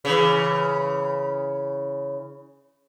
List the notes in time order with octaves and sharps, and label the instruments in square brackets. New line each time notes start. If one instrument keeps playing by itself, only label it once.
[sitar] C#3 E3